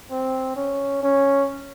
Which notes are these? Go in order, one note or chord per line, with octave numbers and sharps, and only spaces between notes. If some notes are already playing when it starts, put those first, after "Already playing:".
C4
C#4
C#4